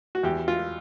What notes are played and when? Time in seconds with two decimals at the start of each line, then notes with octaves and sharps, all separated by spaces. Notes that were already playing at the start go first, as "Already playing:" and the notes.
0.15 F#4
0.23 E2 G4
0.48 F4